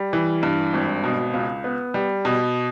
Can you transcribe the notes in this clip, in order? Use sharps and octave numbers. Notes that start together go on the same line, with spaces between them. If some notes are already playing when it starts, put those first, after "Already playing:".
Already playing: G3
E3
G2
G#1
B2
C#2
B3
G3
B2